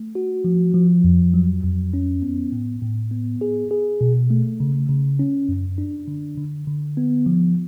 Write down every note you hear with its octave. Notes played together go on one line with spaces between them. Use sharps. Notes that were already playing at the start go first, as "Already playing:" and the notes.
Already playing: A3
F#4
F3
F3
F2
F#3
F2
C#4
B3
A2
A2
B3
G#4
G#4
B2
A3
C#3
C#3
C#4
F#2
D4
D3
D3
D3
B3
F3